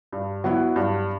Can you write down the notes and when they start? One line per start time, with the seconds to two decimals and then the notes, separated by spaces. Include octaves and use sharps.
0.12 G2
0.44 F#3 B3 E4
0.76 G2